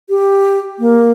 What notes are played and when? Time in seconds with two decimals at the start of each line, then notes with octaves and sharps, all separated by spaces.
0.09 G4
0.79 A#3